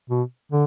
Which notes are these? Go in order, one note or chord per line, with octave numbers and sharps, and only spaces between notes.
B2
D3